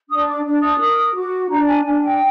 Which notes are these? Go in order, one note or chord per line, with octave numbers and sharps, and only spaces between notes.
D4 D#6
D6
D4
D#6
A#4 D#6
F#4 D6
D4 A#5
G#5
D4 G#5
G5